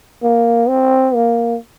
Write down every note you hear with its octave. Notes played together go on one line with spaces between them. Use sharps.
A#3
C4
A#3